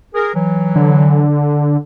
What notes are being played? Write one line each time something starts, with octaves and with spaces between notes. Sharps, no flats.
G#4 A#4
E3 F#3
D3